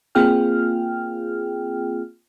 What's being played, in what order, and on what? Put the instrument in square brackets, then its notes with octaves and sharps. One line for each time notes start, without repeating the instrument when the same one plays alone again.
[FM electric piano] A#3 C4 F4 G#4 G5 F6